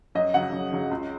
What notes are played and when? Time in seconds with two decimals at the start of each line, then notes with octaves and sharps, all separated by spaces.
0.15 F#2 D#5
0.34 C#3 F#3 F#5
0.53 F#2
0.72 C#3 F#3
0.91 C#2